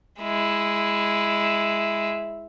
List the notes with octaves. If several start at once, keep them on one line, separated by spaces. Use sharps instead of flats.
G#3 E4